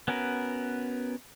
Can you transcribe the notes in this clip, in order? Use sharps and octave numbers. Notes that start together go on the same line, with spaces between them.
B3 C#4 F#4 A#4 B4